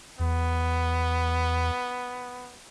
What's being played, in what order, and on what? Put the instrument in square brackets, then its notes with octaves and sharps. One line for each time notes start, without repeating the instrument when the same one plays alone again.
[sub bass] E2 [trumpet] B3